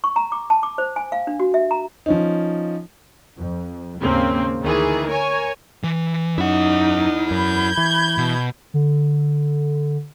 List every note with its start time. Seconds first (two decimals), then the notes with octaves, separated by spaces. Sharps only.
0.04 C#6
0.16 A#5
0.32 D6
0.50 A5
0.63 D6
0.78 C5
0.96 G#5
1.12 F5
1.27 D4
1.40 F#4
1.54 E5
1.71 A#5
2.06 F3 C#4 D#4
3.37 F2
3.99 D#2 G#2 C#3 A#3 C4
4.61 D2 D#3 E3 G#4
5.09 A#4 C#5 G#5
5.84 E3
6.38 F#2 D#4 E4 F#5
7.31 F#2 B5 G6 G#6
7.77 E3
8.18 B2
8.74 D3